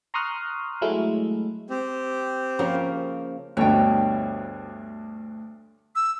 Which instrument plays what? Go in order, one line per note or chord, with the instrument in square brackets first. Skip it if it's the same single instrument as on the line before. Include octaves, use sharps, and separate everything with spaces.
[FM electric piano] A#5 C6 C#6 D#6 F6 F#6
F#3 G#3 A3 E4
[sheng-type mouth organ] C4 G4
[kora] C#3 F3 A#3
[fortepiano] D2 G2 B2 [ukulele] C#5 G5
[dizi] E6